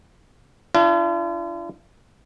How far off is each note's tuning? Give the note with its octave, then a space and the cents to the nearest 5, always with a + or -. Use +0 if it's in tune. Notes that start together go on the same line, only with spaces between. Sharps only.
D4 +0 F4 -45